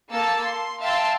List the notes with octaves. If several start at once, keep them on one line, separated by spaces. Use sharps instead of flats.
A#3 A4 A5 E6 A6
C6
E5 F5 G5 A5 C6 E6